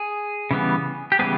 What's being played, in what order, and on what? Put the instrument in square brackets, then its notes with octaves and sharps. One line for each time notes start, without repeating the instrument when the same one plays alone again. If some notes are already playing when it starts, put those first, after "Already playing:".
Already playing: [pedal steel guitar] G#4
C#3 E3 G3 B3
G4
C#3 E3 G3 B3 G#4